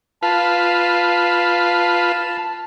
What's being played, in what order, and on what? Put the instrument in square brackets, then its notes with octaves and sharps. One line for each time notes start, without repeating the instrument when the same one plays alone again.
[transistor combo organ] F4 B4 [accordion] A5